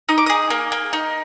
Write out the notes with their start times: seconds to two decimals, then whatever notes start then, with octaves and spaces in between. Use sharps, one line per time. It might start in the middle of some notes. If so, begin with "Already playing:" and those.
0.09 D#4 D#6
0.18 D6
0.26 G#4 D#6
0.50 A#3
0.72 A#3
0.93 D#4